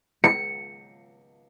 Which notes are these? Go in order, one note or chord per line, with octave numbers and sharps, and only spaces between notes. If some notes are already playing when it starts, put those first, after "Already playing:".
C#7